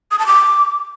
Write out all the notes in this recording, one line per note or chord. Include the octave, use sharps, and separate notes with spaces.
D#6
A5
D6